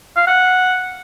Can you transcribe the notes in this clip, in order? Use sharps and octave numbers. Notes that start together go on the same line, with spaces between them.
F5
F#5